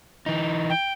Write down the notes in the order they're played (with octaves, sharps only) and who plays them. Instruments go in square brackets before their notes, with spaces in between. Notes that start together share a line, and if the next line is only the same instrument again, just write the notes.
[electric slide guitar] E3 D#4
[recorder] G5